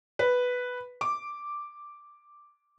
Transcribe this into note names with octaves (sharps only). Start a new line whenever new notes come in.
B4
D6